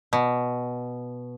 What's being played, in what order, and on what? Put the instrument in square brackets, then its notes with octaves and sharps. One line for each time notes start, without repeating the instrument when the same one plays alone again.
[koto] B2